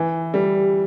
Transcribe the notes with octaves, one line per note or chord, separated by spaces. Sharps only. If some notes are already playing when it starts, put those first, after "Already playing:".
Already playing: E3
G3